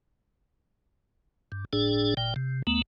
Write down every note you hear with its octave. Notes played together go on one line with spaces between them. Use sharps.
G2
G1 A2 D4 G#4
G1 A#2 G5
C3
D#2 A3 B3